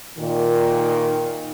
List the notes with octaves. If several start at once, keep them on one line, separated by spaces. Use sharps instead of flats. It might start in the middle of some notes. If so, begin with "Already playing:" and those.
A#2 D#3